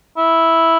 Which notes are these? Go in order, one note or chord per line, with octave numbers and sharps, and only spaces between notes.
E4